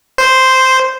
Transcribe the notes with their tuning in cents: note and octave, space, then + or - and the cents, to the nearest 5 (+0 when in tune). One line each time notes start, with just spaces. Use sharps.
C5 -5